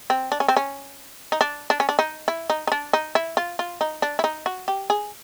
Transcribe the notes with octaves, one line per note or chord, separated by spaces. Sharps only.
C4
D4
C#4
C4
C#4
D#4
D4
D4
C#4
D4
D#4
E4
D#4
D#4
D4
D#4
E4
F4
F4
D#4
D4
E4
D#4
F#4
G4
G#4